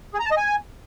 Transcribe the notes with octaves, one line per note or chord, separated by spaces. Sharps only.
G#4
A#5
A5
D#5
G#5